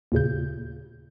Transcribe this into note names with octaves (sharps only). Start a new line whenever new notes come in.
D#2 A#2 C#3 G6